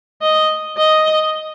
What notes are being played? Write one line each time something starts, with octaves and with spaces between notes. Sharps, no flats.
D#5
D#5